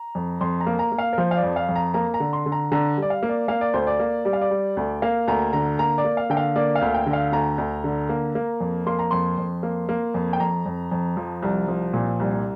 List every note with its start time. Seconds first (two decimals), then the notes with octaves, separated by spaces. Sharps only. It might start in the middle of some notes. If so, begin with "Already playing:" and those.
Already playing: A#5
0.15 F2
0.41 F2 C6
0.60 A#5
0.67 A#3
0.79 A#5
0.92 A#3
0.98 F5
1.13 A#4
1.18 F3 C5
1.31 F5
1.37 D5
1.43 F2
1.56 F5
1.69 F2
1.76 A#5
1.94 A#3 A#5
2.14 A#5
2.20 D3
2.33 C6
2.46 D3
2.52 A#5
2.72 D3 A#5
2.97 G3
3.02 D5
3.10 F5
3.23 A#3
3.29 D5
3.48 A#3 F5
3.61 D5
3.74 D2 C5
3.87 D5
4.00 A#3
4.25 G3 D5
4.33 F5
4.41 D5
4.51 G3
4.77 D2
5.02 A#3 F5
5.28 D2 A#5
5.53 D3 A#5
5.79 A#3 A#5
5.98 D5
6.04 A#3
6.17 F5
6.30 D3 G5
6.37 F5
6.56 A#3 D5
6.75 F5
6.82 D2
6.94 G5
7.06 D3
7.13 F5
7.32 D2 A#5
7.58 D2
7.84 D3
8.09 A#3
8.35 A#3
8.60 F2
8.87 A#3 C6
8.99 A#5
9.11 F2 C6
9.38 F2
9.63 A#3
9.89 A#3
10.14 F2
10.33 G5
10.40 F2 A#5
10.66 F2
10.92 F2
11.17 F3
11.42 C2
11.68 F3
11.93 A#2
12.20 C2